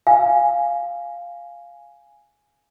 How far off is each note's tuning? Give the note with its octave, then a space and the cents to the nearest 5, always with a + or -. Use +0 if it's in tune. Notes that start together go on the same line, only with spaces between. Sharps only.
F5 +0 G#5 +0